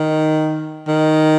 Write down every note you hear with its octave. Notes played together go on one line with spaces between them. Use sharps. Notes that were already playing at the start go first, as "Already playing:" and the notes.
Already playing: D#3
D#3